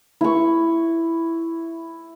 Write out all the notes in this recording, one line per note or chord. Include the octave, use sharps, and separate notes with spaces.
E4 C#6